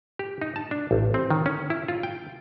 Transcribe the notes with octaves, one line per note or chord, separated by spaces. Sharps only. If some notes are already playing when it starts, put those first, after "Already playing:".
G4
D#4
A5
D4
A1
C4
D#3
C#4
E4
F4
G5